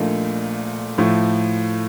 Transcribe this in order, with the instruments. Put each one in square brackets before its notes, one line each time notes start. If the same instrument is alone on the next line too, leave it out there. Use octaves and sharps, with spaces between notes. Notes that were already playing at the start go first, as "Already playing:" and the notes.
Already playing: [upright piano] A#1 A#2 A3 D#4
A2 F3 A3